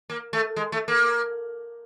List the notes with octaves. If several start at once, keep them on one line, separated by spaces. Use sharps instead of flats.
A#3
A3
G#3
A3
A#3